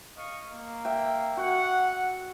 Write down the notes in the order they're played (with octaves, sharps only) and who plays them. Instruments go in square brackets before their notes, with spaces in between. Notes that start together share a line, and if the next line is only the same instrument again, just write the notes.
[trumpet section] D#5 F5 C#6
A#3
[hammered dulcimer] E5 G5
[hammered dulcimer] F#4 [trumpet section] F#5